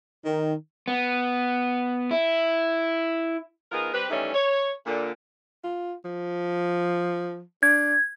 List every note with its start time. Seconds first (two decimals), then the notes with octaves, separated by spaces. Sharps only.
0.25 D#3
0.88 B3
2.11 E4
3.72 F3 B3 D#4 G#4 A#4
3.94 G3 C4 G4 B4
4.10 D#3 E3 G3 A3 C#4 D#4
4.35 C#5
4.86 A#2 D3
5.64 F4
6.05 F3
7.63 D4 G#6